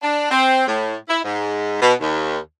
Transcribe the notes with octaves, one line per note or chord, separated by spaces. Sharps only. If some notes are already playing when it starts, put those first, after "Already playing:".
D4
C4
A2
E4
G#2
B2
D#2